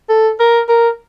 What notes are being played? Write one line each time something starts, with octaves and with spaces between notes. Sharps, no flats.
A4
A#4
A#4